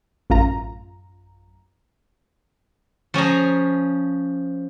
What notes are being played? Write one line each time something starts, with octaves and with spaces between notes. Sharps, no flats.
A1 F#2 F4 A#5
F3 C#4 G#4 A#5